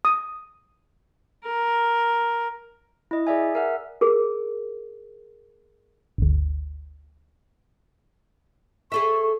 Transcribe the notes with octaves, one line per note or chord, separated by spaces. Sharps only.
D#6
A#4
E4 D#5
G#4 D5 E5 G#5
A#4 E5 F#5
G#4 A#4
G1 D2
G#4 A4 E5 C#6